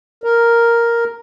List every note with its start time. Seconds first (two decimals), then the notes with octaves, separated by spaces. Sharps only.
0.24 A#4